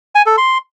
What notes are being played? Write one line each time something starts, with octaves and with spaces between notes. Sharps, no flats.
G#5
A4
C6